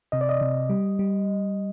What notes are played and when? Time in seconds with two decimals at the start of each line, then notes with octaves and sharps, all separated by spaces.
0.12 C3 D#5
0.21 D5
0.29 D#5
0.41 C3
0.70 G3
0.99 G3